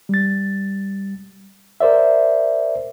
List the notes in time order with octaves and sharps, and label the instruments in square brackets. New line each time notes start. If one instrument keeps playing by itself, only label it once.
[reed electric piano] G3 A6
A#4 C5 D5 E5